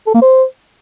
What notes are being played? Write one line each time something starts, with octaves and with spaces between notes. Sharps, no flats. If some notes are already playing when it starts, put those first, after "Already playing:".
A4
A#3
C5